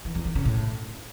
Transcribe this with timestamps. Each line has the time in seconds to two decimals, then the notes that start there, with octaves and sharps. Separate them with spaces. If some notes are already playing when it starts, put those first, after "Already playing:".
0.05 E3
0.15 E2
0.25 D#3
0.35 C#3
0.45 A2